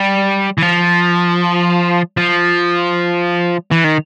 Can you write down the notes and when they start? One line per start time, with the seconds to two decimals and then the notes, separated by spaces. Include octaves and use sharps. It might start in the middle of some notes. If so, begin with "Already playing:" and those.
Already playing: G3
0.58 E3
0.62 F3
2.17 F3
3.71 E3
3.84 D#3